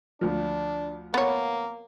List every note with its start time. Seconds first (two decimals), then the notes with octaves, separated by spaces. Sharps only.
0.21 D2 F3 D4
1.14 A#3 B3 C#5